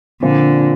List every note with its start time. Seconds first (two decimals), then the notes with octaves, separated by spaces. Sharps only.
0.22 A#2 D3 F3 C4 F4